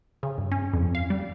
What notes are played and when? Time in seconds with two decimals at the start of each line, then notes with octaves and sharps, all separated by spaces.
0.23 C#3
0.38 G2
0.52 C#4
0.73 F2
0.95 F5
1.10 G3